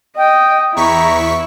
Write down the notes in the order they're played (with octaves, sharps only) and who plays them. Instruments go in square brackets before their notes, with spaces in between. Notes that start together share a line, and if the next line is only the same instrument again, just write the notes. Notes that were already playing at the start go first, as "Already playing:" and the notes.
[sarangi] D#5 [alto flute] G5
[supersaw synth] E2 C#6 B6 [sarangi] E4 [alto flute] A#5